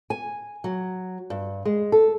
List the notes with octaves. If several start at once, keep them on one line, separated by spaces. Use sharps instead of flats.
G#5
F#3
G2
G#3
A4